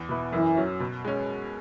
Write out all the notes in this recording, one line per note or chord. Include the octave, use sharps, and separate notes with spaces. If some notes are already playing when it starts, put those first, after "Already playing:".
Already playing: E2
B2 B3 E4
F#2 E3
F#3 C#4
B2
G#3 C#4